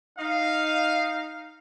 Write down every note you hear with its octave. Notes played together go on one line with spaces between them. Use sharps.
D#4 F5